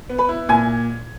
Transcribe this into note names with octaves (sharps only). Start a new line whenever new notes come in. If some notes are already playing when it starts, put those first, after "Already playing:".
B3
B4 B5
E4
A#2 G#5 G#6